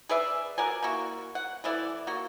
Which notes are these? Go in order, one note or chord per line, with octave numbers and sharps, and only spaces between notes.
G#4 B4 D5 E5
F#4 A#4 D5 G#5
A#3 E4 F#4
F#5
E3 A3 E4 D5
A#3 F#4